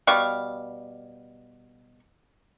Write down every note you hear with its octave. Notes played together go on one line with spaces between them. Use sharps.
B2 G3 F5 C#6